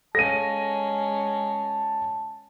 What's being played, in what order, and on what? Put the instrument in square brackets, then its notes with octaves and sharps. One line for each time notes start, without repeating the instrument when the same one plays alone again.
[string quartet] G#3 C#4 [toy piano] A4 F5 [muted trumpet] A5 [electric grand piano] A#6 D#7